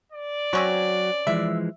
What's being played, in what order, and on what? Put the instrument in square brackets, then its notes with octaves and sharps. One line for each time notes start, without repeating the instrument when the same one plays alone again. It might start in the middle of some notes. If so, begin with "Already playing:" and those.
[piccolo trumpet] D5
[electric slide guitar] F#3 F#4 [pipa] C4 C#4 C#5
[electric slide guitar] E3 F3 G#3 [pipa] E5